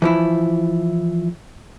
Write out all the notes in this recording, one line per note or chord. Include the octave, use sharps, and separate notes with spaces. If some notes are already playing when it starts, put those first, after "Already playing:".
E3 F3 E4